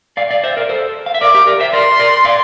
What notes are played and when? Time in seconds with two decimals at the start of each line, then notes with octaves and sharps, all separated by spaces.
0.17 D5 F5
0.31 D5 F5
0.44 C5 E5
0.57 A#4 D5
0.69 A4 C5
1.06 F5
1.14 E5
1.21 A#4 D5 D6
1.35 G4 A#4
1.47 A#4 D5
1.60 C5 E5
1.73 A#4 D5 C6
2.00 A#4 D5
2.25 D5 F5